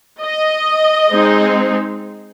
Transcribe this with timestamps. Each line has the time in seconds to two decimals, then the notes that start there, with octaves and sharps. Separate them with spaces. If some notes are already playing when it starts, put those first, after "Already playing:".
0.20 D#5
1.10 G#3 C4 D#4